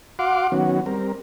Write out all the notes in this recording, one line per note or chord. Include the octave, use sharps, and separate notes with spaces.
F#4 F5 F#5 C6 D6
D#3 F#3 B3 C#4 F#4
G3 C4 A#4